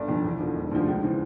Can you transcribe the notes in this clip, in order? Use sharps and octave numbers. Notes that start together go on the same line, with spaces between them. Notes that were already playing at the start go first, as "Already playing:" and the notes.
Already playing: G1 D5
F2 D3 F3
E2
D3 F3
E1
D2 C#3 F3
C#2
C#3 E3